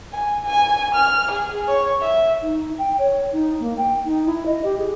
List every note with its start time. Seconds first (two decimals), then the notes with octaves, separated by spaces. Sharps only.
0.13 G#5
0.44 G#5
0.95 F6
1.32 G#4
1.68 C#5
2.02 E5
2.42 D#4
2.78 G5
2.99 C#5
3.32 D#4
3.60 A#3
3.77 G5
4.05 D#4
4.26 E4
4.46 D#5
4.64 G4
4.78 G#4